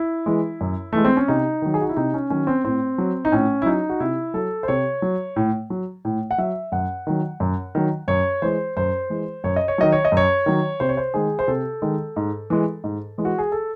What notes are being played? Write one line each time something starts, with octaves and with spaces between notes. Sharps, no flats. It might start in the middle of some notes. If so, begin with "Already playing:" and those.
Already playing: E4
E3 G#3
F#2
E3 G#3 A3
C4
C#4
C3 D#4
D#3 F#3
G#4
F#4
E4
C3 D#4
C#4
D#3 F#3 C#4
C4
A2 C4
F#3
D#4
A2 C#4
E4
F#3 D#4
F#4
C3 E4
F#3 A4
C5
C3 C#5
F#3
A2
F#3
A2
F#5
F#3 E5
F#2 F#5
D#3 F#3
F#2
D#3 F#3
F#2 C#5
E3 G#3 C5
F#2 C5
E3 G#3
F#2 C#5
D#5
C#5
D#3 F#3 D#5
C#5
D#5
F#2 C#5
D#3 F#3
C3 C5
C#5
C5
D#3 G#3 G#4
C5
C3 A4
D#3 G#3
G#2
E3 G#3
G#2
E3 G#3
F#4
G#4
A4